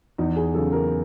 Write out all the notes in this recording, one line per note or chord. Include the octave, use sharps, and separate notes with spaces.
E2 D#4
G#4
C#3 F#3 A4
A#4